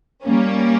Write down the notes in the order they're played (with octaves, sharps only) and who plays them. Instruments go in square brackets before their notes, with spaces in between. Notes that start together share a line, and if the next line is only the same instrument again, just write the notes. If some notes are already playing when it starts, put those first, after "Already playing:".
[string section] G3 A#3 C#4